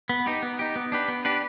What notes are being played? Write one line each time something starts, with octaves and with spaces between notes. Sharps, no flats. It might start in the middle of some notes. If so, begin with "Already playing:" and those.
B3
D#4 G4
B3
D#4 G4
B3
D4 G4 B4
B3
D4 G4 B4